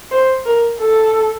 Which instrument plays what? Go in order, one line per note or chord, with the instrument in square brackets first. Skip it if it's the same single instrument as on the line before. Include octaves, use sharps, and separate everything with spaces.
[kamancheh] C5
A#4
A4